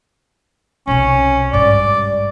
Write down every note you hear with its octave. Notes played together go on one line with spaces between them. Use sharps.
B1 C3 C#4
G#1 G2 D5